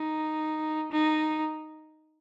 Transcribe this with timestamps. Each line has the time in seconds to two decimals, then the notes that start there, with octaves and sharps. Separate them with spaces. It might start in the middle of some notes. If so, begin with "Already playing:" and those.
Already playing: D#4
0.91 D#4